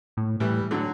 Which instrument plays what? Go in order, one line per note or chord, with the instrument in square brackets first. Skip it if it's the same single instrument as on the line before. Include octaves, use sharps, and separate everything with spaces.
[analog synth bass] A2
[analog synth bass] A2 [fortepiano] E3 G3
[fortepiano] D3 F#3
[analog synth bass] A2